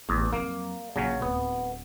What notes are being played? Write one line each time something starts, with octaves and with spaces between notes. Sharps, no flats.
A1 E2
F2 F#3 A#3
A#1 C#3 F#3 C#4
D1 B3